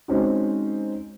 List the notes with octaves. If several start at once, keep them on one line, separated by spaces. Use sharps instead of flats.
G#3 C4 C#4 D#4 F#4